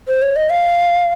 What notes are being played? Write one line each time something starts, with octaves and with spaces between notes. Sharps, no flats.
C5
C#5
D#5
F5